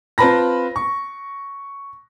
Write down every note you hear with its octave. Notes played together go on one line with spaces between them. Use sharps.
C4 F4 B4 A5 B5 A#6
C#6